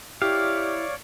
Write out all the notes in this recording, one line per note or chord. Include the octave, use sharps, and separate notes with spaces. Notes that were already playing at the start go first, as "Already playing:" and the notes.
E4 G4 C#5 D5 F5